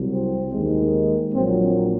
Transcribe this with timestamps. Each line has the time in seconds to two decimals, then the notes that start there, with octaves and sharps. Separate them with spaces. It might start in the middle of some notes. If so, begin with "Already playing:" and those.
Already playing: C2 C3 F#3
0.13 C4
0.52 D#2 D#3 G#3
1.33 A#1 A#2 F#3 C4